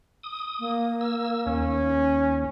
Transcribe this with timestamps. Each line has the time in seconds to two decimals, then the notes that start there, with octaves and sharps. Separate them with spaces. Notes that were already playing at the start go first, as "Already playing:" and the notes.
0.23 D#6
0.59 A#3
1.01 E6
1.46 D#2 C#4